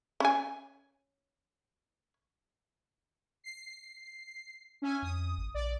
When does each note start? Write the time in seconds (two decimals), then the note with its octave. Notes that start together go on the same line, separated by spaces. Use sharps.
0.20 C#4 G#5
3.44 C7
4.82 C#4 E5 G#5
5.02 F2 D#6
5.38 G#1
5.54 A#1 D5